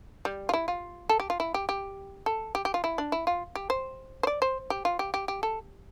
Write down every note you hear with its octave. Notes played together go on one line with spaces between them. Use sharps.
G3
F4
E4
F4
A4
G4
F4
E4
G4
G4
A4
G4
G4
F4
E4
D4
E4
F4
G4
C5
C5
D5
C5
G4
F4
G4
G4
G4
A4